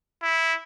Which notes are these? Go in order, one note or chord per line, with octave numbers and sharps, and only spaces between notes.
E4